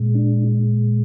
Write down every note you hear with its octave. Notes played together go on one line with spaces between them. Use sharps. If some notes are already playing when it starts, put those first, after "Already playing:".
Already playing: A#2 G#3
D4